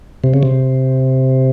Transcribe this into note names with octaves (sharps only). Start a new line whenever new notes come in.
C3
C#3
C3